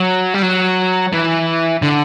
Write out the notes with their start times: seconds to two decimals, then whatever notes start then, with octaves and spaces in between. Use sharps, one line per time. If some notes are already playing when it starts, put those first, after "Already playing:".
Already playing: F#3
0.34 G3
0.42 F#3
1.13 E3
1.82 D3